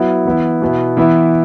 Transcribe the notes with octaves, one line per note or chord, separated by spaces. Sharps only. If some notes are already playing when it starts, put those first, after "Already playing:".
Already playing: F#3 B3 E4
E3 B3 E4
B2 B3 E4
E3 B3 E4